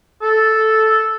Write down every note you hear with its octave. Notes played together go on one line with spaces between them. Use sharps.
A4